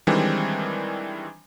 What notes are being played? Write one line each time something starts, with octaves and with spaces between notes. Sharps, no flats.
D#3 E3 G3 G#3 C4 D4